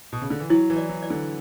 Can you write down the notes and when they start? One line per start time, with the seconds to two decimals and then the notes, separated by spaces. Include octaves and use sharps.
0.13 B2
0.22 C#3
0.30 D3
0.40 E3
0.50 F#3 E4
0.70 E3
0.77 D5
0.89 F#3
1.02 D5
1.10 D3